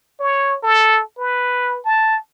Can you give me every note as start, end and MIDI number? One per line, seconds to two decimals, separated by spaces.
0.20 0.57 73
0.63 1.01 69
1.18 1.79 71
1.85 2.18 81